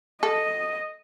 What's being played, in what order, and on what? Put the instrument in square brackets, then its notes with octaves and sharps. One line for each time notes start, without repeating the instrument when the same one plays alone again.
[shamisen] A4 [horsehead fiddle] D#5